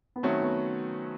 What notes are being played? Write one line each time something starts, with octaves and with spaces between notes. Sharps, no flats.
B3
D#3 F#3 A3 C4 C#4 F#4
B3